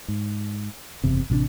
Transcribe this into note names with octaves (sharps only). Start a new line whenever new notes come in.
G#2
F#1 E2 C3
A1 C3 D#3 D4